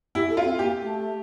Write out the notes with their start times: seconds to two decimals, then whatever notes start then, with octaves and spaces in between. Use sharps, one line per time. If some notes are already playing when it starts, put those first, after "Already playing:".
0.15 E4 G4
0.29 A4
0.37 F4
0.44 C4
0.59 A#3 G4
0.82 A3